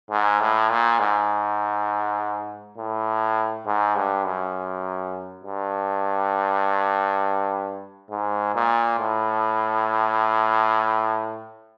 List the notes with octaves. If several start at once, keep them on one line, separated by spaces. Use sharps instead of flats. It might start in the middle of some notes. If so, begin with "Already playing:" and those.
G#2
A2
A#2
G#2
A2
G#2
G2
F#2
G2
G#2
A#2
A2